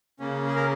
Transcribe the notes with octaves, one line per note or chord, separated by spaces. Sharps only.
C#3 A#3 C#4
G#4
A#4